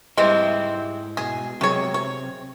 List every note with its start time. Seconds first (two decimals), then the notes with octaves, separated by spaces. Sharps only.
0.17 G#2 C3 E3 G3 G#3 C4 E4 D#5
1.17 B2 G#4
1.61 C3 D#3 F#3 G#3 G#4 C#5
1.94 C4 C#5